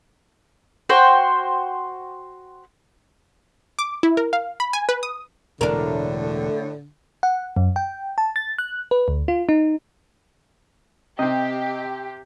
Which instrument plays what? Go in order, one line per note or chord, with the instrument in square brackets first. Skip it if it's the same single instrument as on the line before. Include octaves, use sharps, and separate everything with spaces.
[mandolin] F#4 C5 G5
[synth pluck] D6
E4
A#4
F5
B5
G#5
B4
D#6
[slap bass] E1 [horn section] A2 [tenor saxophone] D3 [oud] D4 A#4
[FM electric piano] F#5
F#2
G5
A5
A6
F#6
B4
D2
F4
D#4
[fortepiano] C3 C4 [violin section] G4 [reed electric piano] D#5